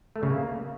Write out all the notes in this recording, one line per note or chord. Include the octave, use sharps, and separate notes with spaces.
A3
C#3
A#3